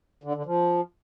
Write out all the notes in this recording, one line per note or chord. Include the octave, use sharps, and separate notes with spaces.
D3
D3
F3